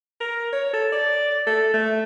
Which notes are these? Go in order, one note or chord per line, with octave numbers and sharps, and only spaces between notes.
A#4
C#5
A4
D5
A4
A3